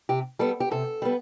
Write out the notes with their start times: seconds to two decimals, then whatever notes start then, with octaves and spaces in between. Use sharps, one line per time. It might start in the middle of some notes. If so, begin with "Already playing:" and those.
0.09 C3 G4
0.39 G3 B3 A4
0.60 G4
0.71 C3 A4
1.02 G3 B3